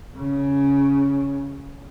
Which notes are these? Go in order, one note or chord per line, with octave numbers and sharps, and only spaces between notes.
C#3 C#4